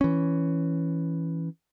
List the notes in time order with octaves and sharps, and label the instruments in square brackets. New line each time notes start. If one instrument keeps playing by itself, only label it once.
[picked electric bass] E3 C#4